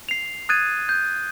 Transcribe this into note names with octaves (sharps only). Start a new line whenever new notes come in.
C7 F7
D#6 F#6 G#6 A6 D#7
G6